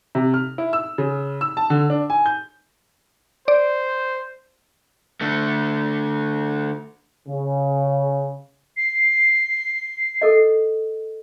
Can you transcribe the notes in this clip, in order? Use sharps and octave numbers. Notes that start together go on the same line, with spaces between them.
C3
F6
E4
E6
C#3
E6
A5
D3
D4
G#5
G6
C5 D5
D3 A3
C#3
C7
A4 A#4 D#5